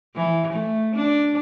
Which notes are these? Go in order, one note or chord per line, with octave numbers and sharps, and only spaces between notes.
E3
A3
D4